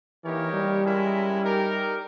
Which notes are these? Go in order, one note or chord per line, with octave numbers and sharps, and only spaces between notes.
E3 A#3 D#4 G4 A#4 C#5
G3
G#3 C#4 E4 A#4 E5
D#4 G4 A#4